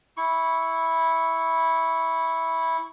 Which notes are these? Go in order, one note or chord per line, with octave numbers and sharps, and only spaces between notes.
E4 C#6